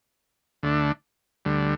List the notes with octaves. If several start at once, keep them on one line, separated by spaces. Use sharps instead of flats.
D2 D3 A3 D4
D2 D3 G3